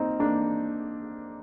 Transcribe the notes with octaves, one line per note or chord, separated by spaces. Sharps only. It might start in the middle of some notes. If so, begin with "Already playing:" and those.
Already playing: A#3 C4 D#4
A#3 D4